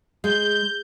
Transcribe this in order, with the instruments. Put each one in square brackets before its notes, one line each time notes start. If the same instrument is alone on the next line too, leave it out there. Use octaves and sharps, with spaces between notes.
[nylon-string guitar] G#3 [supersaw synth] G6